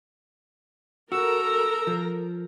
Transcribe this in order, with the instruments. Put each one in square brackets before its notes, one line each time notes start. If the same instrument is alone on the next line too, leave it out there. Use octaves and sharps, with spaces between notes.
[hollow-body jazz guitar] F#4 [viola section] A4 A#4 A#5 [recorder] E6
[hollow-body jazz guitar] F3